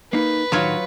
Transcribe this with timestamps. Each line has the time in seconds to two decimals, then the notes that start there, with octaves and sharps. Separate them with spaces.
0.13 A#3 D#4 B4
0.52 A2 D#3 F#3 F4 F#4 C#5